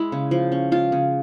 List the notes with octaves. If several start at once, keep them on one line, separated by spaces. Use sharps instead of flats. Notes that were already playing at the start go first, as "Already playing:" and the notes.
Already playing: G#3 E4
C#3
F3
C#4
G#3 F4
C#3